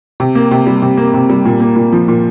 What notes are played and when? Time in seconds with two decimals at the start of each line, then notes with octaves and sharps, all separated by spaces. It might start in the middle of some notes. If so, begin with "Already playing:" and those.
0.20 C3
0.35 A#3
0.51 C3
0.67 G3
0.82 C3
0.97 A#3
1.14 C3
1.30 G3
1.45 A#2
1.60 A#3
1.76 A#2
1.92 F3
2.08 A#2